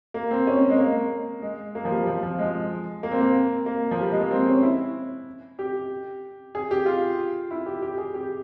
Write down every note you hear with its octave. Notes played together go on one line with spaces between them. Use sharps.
A#3
C4
C#4
G#3
A#3
G#3
A#3
F3
G3
F3
F3
G#3
A#3
C4
A#3
A#3
F3
G3
G#3
A#3
C4
C#4
E4
G4
G#4
G4
F4
E4
G4
G4
G#4
G4